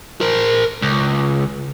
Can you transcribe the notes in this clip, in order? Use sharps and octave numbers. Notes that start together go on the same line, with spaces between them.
A#4 C5
C#2